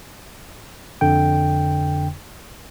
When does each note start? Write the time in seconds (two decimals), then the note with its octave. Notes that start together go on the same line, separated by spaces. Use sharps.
1.01 F2 D3 G5